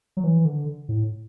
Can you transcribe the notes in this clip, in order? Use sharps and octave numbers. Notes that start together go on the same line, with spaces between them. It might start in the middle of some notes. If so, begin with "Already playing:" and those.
F#3
E3
D3
A2